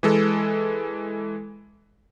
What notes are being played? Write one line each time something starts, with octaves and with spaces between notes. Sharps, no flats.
E3 G#3 A4